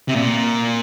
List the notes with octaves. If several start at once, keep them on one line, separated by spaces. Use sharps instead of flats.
C3
A#2